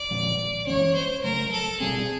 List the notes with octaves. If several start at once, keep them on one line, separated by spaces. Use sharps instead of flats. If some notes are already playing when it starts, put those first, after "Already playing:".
Already playing: D5
A#2 F3 G#3
E3 G#3 C#4 C#5
C5
C#3 F#3 A3 A#4
A4
B2 G3 C4 G#4